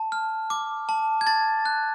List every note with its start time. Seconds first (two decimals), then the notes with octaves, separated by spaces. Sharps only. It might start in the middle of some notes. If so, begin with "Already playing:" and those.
Already playing: A5
0.12 F6
0.50 D6
0.89 A5
1.21 G#6
1.26 A5 A6
1.65 F#6